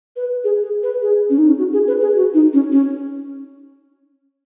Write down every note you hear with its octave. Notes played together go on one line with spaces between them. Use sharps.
B4
G#4
G#4
B4
G#4
C#4
D#4
C#4
F#4
G#4
B4
G#4
F#4
D#4
C#4
C#4